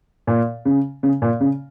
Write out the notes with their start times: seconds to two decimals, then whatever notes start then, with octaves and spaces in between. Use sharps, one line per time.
0.27 A#2
0.65 C#3
1.03 C#3
1.22 A#2
1.40 C#3